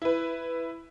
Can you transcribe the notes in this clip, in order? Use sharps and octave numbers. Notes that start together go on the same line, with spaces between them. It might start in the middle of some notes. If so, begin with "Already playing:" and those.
E4 B4